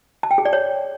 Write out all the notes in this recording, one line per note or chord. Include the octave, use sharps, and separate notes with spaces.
A5
G5
G#4
D5
C#5